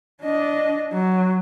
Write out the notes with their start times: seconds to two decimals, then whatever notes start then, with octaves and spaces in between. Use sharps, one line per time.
0.22 D4 D#5
0.93 F#3